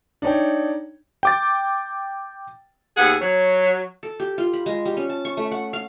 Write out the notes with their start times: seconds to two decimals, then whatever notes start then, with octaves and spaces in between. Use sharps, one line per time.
0.22 D4 D#4 C#5 G5
1.23 G5 D6 A6
2.96 D#2 B3 G#4 F#5
3.21 F#3 C#5
4.03 A4
4.20 G4
4.38 F4
4.53 B5
4.66 G#3
4.85 G3
4.97 C#4
5.09 A5
5.25 C#6
5.37 A3
5.51 F#5
5.73 F5